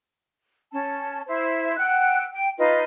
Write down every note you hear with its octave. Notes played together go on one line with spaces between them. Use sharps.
C#4 A5
E4 C5 E5
F#5 G5 E6 F#6
G5
D#4 F4 B4 D#5